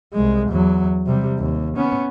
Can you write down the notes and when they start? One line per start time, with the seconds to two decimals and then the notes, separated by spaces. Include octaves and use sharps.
0.13 C2 G#3
0.50 E2 F#3
1.06 C3 G3
1.39 D#2
1.76 B3 C#4